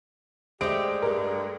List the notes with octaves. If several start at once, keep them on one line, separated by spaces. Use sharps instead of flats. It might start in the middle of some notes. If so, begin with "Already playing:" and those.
G#3 A3 G4 C5 D5 D7
G2 A#4